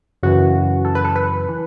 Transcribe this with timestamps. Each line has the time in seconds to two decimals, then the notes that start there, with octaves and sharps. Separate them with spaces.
0.23 F#2 C#3 E3 F#4
0.85 A4
0.95 B4
1.05 A4
1.16 B4
1.49 E3